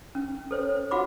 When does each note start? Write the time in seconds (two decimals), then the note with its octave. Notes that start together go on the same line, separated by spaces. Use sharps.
0.15 C#4
0.51 A4 C5 C#5
0.91 F4 F#4 F5 F#5 B5 D6